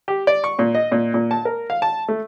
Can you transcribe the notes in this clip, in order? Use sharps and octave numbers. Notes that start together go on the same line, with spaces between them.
G4
D5
C#6
A#2
D#5
A#2
A#2
A5
A#4
F5
A5
A3